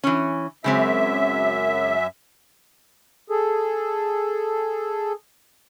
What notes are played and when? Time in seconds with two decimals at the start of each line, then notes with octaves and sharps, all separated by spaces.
0.04 E3 C#4
0.64 F#2 C#3 G#3 C4 E5
3.30 G#4 A4